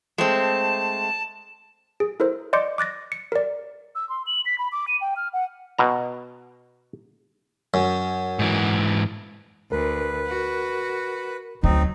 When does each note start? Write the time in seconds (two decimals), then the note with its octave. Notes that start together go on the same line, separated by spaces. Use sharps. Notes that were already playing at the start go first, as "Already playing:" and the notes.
0.18 G#3 A3 C4 A5
2.00 G#4
2.20 E4 A4 A#4 C5
2.53 D5 D#5 C6 D6 G6 C#7
2.78 D6 F#6 A6 A#6
3.12 C#7
3.32 A#4 D5
3.95 E6
4.09 C6
4.27 F#7
4.46 B6
4.58 B5
4.72 D6
4.88 D#7
5.01 G5
5.16 F6
5.33 F#5
5.79 B2 A#5
7.74 F#2
8.39 G#2 E3
9.72 D2 A#4 B4
10.27 F#4
11.63 D2 F#3 C4 D#4